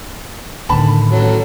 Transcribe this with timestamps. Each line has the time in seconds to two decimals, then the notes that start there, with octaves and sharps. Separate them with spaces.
0.69 A2 D3 D#3 A5 B5
1.11 A1 F#3 A4